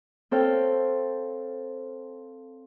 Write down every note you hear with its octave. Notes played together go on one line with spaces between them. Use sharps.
C4 A4 C#5 F5 G5